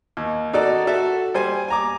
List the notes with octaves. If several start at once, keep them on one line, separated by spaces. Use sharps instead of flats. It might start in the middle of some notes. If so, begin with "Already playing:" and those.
D#2
D#4 F#4 A4 D5
F#4 A4 E5
G3 C5 G#5
G#5 A#5 D6